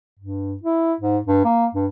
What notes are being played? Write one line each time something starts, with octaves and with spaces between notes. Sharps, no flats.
G2
E4
G#2
G2
A#3
G2